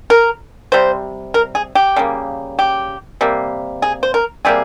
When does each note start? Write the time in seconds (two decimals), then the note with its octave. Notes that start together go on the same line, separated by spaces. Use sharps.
0.10 A#4
0.72 C3 G3 C5
1.34 A#4
1.55 G#4
1.75 G4
1.96 C#3 G3 A#3
2.59 G4
3.21 C3 G3 A#3
3.82 G#4
4.03 C5
4.14 A#4
4.45 C3 G3 A#3 G#4